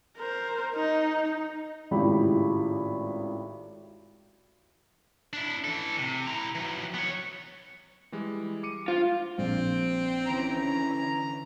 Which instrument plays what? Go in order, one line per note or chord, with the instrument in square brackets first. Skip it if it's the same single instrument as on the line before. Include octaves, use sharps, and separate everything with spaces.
[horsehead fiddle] A#4 C5
D#4
[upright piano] G#1 A2 C#3 F4 G4 B5
[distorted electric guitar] D4 E4
E3 A4
C3
E4 A#5
E3 F#3
B3 C#5
[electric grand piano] E3 G3 G#3
D6 C#7 D#7
[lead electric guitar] F4 [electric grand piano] C5
[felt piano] A#1 [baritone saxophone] C4
[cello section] D3 E3 C#4 [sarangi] A#5